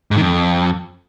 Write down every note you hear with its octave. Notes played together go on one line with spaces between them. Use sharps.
G#2
D#3
F2